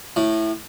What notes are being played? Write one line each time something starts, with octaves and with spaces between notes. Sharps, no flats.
A2